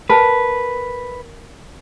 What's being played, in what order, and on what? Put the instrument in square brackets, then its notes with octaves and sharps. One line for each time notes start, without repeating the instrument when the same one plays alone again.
[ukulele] A#4 A5 [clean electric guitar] B4